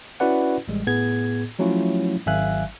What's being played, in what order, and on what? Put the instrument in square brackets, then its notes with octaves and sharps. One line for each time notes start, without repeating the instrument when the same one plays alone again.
[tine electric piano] C#4 E4 F#4 B4 D5 F#5
A1 G3 G#3
A2 B3 G#4 G#6
F3 F#3 A3 C#4 E4 F4
G#1 F#3 E5 F5 G#5 F#6